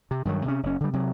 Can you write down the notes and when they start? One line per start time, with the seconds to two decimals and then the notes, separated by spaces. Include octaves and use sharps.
0.11 C3
0.25 G2 D#3 F#3
0.46 C3 C#4
0.63 F#1 C#4
0.80 D3 G3
0.93 C3 F#3